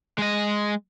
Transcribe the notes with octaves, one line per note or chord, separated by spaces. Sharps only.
G#3 D#5